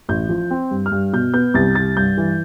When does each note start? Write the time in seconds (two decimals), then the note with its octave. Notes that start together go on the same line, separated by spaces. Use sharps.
0.09 A1 G6
0.29 F3
0.51 C4
0.71 G2
0.86 F6
0.92 G2
1.13 B2 G6
1.34 B3 G6
1.54 C2 A6
1.75 C2 A6
1.97 G2 G6
2.18 E3